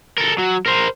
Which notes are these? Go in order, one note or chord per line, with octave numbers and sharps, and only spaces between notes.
A4 A#4
F#3
A#4 C5